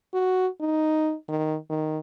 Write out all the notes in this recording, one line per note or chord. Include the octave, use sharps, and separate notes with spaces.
F#4
D#4
D#3
D#3